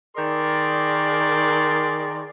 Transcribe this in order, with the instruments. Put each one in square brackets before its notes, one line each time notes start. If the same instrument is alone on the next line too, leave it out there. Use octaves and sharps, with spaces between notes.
[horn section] D#3 G#4 A#4 D5 C6